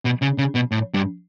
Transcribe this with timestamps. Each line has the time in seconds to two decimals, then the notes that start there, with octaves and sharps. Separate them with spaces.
0.05 B2
0.22 C#3
0.38 C#3
0.55 B2
0.71 A2
0.94 G2